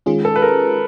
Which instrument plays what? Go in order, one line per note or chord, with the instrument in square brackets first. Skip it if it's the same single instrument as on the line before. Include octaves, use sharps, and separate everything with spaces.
[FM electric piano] D#3 G#3 C#4 F4 G#4
[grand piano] A4
B4
A#4